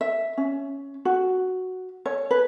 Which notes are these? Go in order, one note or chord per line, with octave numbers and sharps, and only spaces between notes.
E5
C#4
F#4
C#5
B4